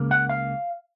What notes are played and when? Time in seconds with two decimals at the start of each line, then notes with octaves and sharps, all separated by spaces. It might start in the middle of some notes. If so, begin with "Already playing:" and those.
Already playing: C#2 C#3 A#3
0.11 F#5
0.29 F5